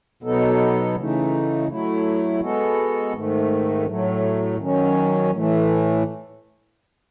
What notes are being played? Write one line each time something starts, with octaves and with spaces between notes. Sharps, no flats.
B2 F#3 B3 D#4 A4
C#3 E3 A3 D#4
F#3 A3 E4
G#3 B3 F#4 A4
G#2 D#3 A3
A2 F#3 A3
D#3 F#3 C#4
A2 E3 A3